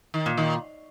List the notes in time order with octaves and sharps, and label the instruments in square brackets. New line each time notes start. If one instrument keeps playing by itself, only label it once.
[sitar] D#3
[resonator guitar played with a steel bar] A#2
[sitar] D#3